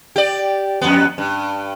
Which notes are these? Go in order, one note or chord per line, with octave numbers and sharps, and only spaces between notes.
G4 D5
F2 B3
G2